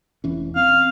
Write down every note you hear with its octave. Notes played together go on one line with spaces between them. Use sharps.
F1 E3 C#4
C4 F5